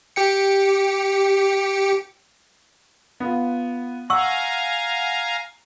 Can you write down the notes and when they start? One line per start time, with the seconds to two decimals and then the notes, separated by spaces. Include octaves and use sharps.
0.16 G4 G5 C#7
3.20 B3 F4
4.10 F5 F#5 G#5 A#5 C#6 E6